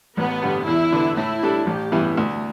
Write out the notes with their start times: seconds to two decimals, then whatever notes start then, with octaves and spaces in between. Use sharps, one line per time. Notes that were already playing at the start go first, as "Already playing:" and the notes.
0.17 A1 B3
0.43 G2 D3 G3
0.67 E2 E4
0.92 D3 B3
1.17 A2 E4
1.42 G3 D4 A4
1.67 A1 G4
1.92 G2 E3 B3 E4
2.17 D2 A3